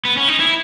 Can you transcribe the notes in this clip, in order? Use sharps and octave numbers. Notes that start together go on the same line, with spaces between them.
B3
C#4
D#4
E4